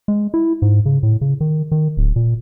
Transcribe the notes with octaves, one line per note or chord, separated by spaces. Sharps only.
G#3
E4
G#2
C#3
A2
C#3
D#3
D#3
D1
A#2